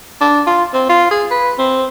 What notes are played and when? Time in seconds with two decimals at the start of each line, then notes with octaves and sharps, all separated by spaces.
0.21 D4
0.47 F4
0.74 C4
0.89 F4
1.11 G#4
1.31 B4
1.59 C4